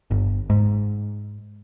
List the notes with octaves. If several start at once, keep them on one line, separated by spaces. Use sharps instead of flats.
G1
G#2